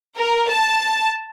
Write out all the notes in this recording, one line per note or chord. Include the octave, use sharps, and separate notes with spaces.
A#4
A5